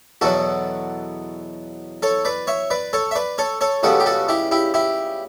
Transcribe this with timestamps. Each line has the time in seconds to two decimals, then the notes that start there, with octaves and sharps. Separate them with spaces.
0.21 E2 B2 F#3 F#4 A4
2.02 A4 C#5
2.25 B4 D5
2.47 C#5 E5
2.70 B4 D5
2.93 A4 C#5
3.11 E5
3.15 B4 D5
3.38 A4 C#5
3.61 A4 C#5
3.83 C#2 C#3 G3 B3 F#4 A4
4.00 G4
4.06 F#4 A4
4.29 E4 G4
4.51 E4 G4
4.74 E4 G4